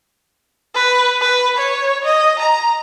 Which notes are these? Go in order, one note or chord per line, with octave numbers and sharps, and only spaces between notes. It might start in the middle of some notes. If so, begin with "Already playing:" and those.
B4
B4
C#5
D#5
A#5